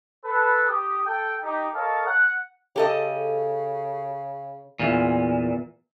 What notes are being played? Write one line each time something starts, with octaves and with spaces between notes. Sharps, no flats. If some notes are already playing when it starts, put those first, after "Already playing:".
A4 B4
G4 D#6
A4 G5
D#4 G4
A4 A#4 C#5 D#5 F5 A5
F#5
C#3 G4 A4 D#5
E2 A#2